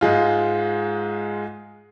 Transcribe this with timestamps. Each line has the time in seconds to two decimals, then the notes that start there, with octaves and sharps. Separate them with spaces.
0.01 G#2 G#3 F4